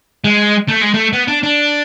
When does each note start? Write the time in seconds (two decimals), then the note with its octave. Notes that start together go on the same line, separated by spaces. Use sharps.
0.24 G#3
0.68 A3
0.81 G#3
0.94 A3
1.13 B3
1.28 D4
1.43 D4